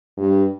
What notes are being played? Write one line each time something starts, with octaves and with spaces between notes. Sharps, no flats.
G2